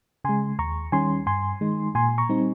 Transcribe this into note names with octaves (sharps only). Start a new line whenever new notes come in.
C#3 G#3 G#5 C6
D#2 A#5 C#6
D#3 G3 C#4 G#5 C6
G2 G#5 C6
D#3 G#3 D#4
A#2 G#5 C6
A#5 C#6
G3 C4 D#4